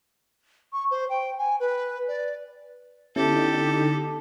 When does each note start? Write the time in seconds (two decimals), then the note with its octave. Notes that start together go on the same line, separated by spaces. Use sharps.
0.73 C#6
0.91 C5
1.09 G5
1.38 G#5
1.60 B4
2.08 D5
3.16 D3 B3 C#4 D#4 E4 G4 A4